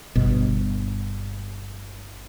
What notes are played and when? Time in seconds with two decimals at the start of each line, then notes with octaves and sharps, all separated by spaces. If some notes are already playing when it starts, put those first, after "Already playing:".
0.16 G1 B2